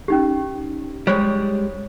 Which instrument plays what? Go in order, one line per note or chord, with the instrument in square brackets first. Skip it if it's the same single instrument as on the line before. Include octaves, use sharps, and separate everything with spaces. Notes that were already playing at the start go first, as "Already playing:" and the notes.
[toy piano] C#4 D#4 G4
[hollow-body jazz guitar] G3 G#3 [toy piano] C5 C#5 C#6